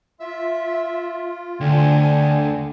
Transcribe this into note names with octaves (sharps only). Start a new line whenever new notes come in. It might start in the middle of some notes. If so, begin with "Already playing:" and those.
F4 E5
D2 D3 G5 G#5